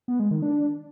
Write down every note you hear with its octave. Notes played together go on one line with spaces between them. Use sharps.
B3
G#3
D#3
D4